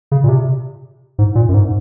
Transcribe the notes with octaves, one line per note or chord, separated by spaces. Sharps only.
C#3
A#2
C3
G#2
A#2
F#2
G#2